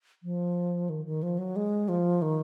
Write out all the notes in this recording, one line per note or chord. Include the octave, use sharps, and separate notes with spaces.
F3
D#3
D#3
F3
F#3
G#3
F3
D#3